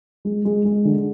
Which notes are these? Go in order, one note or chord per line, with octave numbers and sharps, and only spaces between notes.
G#3
G#3
G#3
D3